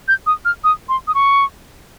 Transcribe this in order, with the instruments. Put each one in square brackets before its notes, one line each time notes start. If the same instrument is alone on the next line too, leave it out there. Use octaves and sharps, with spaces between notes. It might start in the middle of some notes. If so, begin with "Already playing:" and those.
[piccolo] G6
D#6
F6
D#6
C6
D#6
C#6